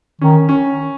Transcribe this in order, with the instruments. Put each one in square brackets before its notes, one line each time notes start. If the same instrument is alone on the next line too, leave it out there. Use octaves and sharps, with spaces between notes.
[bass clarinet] D#3 [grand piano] C#4
[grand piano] C#4